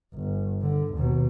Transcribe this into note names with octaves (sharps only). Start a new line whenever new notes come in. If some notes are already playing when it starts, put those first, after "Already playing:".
G1
D3
D#2 B2